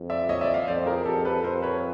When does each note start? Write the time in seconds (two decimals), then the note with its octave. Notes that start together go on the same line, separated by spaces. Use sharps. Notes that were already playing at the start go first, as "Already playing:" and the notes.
Already playing: F2
0.10 D5 E5
0.29 C#5 D#5
0.41 D5 E5
0.54 D#5 F5
0.68 F2 C5 D5
0.86 G#4 A#4
1.05 F2 G4 A4
1.25 A4 B4
1.43 F2 A#4 C5
1.62 B4 C#5